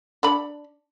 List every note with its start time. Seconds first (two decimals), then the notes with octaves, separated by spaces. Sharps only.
0.23 D4 D5 B5